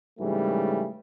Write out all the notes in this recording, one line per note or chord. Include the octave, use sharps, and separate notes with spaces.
G#2 C#3 E3 G3 A3